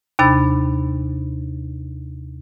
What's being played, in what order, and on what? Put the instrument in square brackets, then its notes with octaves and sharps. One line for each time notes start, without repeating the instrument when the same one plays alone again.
[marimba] D#2 C3 D4 B5 A6